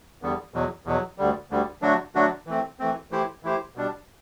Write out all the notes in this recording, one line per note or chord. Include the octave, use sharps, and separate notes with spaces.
E2 D3 G3 B3
E2 B2 F#3
E2 B2 F#3
D2 D3 G3
D2 D3 G3
D3 F#3 A3 D4 F#4
D3 F#3 A3 D4 F#4
E3 A3 C4
E3 A3 C4
E3 A3 E4 G4 C5
E3 A3 E4 G4 C5
B2 G3 D4